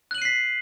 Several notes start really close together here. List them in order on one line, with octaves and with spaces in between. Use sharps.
F#6 F#7 D#7 C7 B6